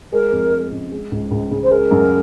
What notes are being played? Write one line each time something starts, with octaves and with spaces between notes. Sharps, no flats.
G#3 A#4
F2
G#3
C#3
G#3
C#2
C#2
C#3
C5
G#3 A#4
F#2